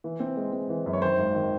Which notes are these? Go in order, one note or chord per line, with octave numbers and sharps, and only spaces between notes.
E3
C4
G#3
C4
E3
F#2
C#5
D#3 C5
G#1
D#3